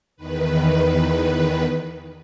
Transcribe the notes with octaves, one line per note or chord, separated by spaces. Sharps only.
E2 D#3 B4